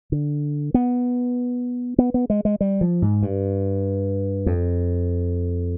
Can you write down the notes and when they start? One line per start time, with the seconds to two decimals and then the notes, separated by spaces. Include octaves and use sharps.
0.12 D3
0.74 B3
1.98 B3
2.14 B3
2.30 G#3
2.45 G#3
2.61 G3
2.81 F3
3.02 G#2
3.23 G2
4.46 F2